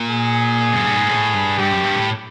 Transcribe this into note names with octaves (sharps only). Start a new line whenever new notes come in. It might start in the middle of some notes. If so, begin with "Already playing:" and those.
Already playing: A#2
G#4
F#2
G2
G#2
A2
G2
G2 G4
F#2
G2
A2